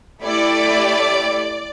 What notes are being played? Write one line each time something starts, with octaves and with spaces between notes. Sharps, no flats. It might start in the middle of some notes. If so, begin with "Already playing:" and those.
A3 E4 G4 D5